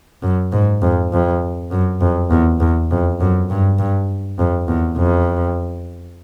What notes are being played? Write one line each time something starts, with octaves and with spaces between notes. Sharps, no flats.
F#2
G#2
F2
F2
F#2
F2
E2
E2
F2
F#2
G2
G2
F2
E2
F2